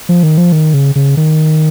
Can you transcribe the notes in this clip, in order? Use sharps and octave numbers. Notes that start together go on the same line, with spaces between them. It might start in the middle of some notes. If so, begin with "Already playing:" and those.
F3
D#3
F3
D#3
C#3
C#3
D#3